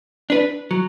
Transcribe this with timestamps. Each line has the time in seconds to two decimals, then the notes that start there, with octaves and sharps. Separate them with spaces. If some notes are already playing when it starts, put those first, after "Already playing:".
0.30 D4 B4
0.71 F#3